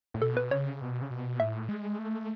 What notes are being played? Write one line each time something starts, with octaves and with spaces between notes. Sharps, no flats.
A2
B2 A4
B4
C#3 C#5
B2
C#3
B2
A2 E5
G#3
A3